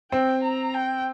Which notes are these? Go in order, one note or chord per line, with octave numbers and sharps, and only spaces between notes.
C4 G5
A#5
G5